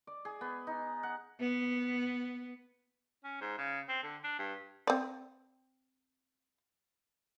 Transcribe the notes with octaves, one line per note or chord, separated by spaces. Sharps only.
D5
G#4
B3
D#4
F#5
B3
C#4
G#2
C#3
C4
D3
D4
G2
C4 D5